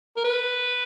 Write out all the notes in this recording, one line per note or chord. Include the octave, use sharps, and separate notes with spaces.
A#4
B4